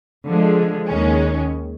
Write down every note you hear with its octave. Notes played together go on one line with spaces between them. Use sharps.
D3 F3 G#3
D#2 D#3 G#3 C#4